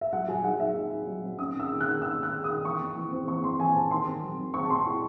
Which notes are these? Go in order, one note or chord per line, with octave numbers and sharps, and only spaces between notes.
E5
F#3 F#5
F#3 G#5
D#4 F#5
D#4 E5
D#4
D#4
F#3
C4
C#4 D#6
D#3
E6
D#3
F#6
D#3
D#3 E6
G#3
F#6
D#3
D#6
D#3
E3 C#6
C4
E3
C4
E3 C#6
E3 C6
E3 G#5
C4 A5
D#3 C6
C4
F#3
D#3
C4 C#6
A5
C4 C6
E4 C#6